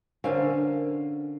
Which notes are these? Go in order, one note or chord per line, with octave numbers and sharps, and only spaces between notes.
D3 C#4 A#4 C5 F5